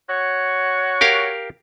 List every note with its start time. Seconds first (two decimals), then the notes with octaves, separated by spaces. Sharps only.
0.08 F#4 C#5
1.01 G4 A#4 F5